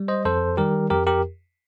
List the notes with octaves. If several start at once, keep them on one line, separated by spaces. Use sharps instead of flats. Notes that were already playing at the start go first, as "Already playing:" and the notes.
Already playing: G3
C5 D#5
F2 A4 C5
D#3 G3 G4 A#4
F2 G4 A#4
G4 A#4